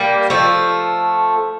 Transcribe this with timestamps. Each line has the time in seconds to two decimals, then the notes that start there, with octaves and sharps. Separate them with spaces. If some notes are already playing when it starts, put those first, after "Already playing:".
Already playing: G3 A#3
0.30 F3 A3